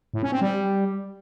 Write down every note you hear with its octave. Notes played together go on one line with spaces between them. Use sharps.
A2
C#4
C4
G3